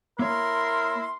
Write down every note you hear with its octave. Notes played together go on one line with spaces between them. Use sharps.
A#3 E4 A#4 C#5 C6